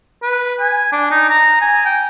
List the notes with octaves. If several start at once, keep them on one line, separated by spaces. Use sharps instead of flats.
B4
G#5
D4
D#4
A#5
G#5
G5